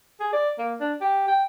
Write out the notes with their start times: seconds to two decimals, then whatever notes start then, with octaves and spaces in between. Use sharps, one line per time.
0.20 G#4
0.33 D5
0.58 A#3
0.80 D4
1.01 G4
1.28 G5